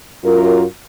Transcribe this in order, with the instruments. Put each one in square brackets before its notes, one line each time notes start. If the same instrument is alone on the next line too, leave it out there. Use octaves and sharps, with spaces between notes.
[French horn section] F#2 F4 A#4